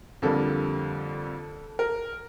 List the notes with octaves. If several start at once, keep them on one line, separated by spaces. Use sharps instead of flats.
F2 D3 G3 A#3 A4
A#4